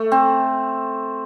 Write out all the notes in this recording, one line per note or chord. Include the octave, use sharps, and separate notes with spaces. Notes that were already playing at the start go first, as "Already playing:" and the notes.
Already playing: A3
C4